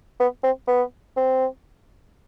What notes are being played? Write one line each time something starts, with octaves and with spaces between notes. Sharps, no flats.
B3
C4
B3
C4